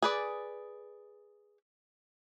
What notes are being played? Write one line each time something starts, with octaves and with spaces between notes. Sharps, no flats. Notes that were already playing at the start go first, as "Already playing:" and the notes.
G#4 B4 D5